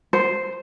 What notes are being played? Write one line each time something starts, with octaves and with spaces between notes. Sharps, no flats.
C5